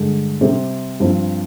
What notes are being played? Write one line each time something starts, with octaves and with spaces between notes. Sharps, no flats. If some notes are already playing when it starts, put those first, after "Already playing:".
Already playing: G2 D3 G#3
C3 G3 C4 G4
G2 F3 C4